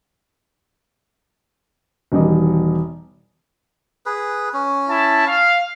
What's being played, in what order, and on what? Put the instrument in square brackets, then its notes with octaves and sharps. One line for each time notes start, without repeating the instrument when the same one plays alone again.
[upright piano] E1 D#3 G3 D#5 D#6
[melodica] G#4 B4
C#4
[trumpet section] E4 A5
F5